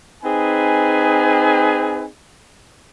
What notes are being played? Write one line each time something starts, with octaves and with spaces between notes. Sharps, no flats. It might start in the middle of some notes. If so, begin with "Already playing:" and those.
C4 D#4 G#4 B4 G#5